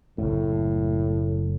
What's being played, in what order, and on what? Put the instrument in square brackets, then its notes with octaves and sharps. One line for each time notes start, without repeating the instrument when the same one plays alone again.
[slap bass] F#1 A3 [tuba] A2